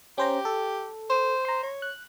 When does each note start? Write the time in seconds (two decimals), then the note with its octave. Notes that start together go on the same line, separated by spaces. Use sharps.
0.18 C#4 G4 C5 A#5
0.45 A4
1.10 C5
1.45 A#5 C6
1.63 C#5
1.82 F#6